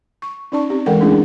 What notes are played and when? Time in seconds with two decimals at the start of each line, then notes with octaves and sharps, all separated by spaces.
0.22 C#6
0.52 C#4 D#4 D5 A5 C#6
0.70 C4 G4
0.86 E3 G#3 A4 A#4 F#5 G5
1.00 G#3 A3 C#4 D4 E4 G#4